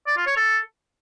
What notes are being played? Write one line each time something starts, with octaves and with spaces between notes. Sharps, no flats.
D5
F4
C#5
A4